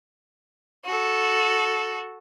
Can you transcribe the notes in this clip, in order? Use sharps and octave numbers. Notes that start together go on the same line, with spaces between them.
F#4 A4